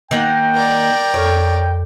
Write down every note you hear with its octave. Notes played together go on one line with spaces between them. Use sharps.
D#3 A#3 F#5 G5
A#4 D5
F2 A4 C#5 F6